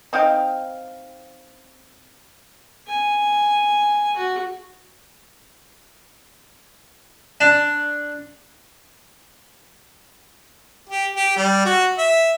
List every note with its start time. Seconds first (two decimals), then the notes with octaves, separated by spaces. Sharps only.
0.13 C4 D#4 F5 G5
2.87 G#5
4.16 F#4
7.41 D4
10.89 G4
11.16 G4
11.37 G3
11.65 F#4
11.98 E5